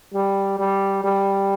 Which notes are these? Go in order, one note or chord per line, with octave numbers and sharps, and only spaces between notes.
G3
G3
G3